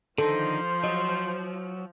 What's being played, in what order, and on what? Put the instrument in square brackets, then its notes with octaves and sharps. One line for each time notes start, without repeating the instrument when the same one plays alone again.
[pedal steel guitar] D3 D#3 D#4 [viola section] F3 [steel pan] A4 [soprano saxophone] C5
[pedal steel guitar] F#3 [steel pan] D#5